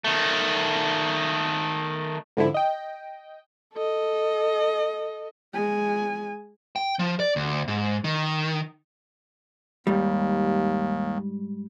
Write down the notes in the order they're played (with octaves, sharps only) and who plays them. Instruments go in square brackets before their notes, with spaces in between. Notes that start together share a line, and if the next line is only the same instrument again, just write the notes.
[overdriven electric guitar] D#3 A3
[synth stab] G#2 D3 F3 E4
D#5 G5
[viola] A4 D#5
[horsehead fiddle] G#3 G#5
[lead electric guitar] G5
F3
D5
D2
G#2
D#3
[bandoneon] D#2 [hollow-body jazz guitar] G#2 G3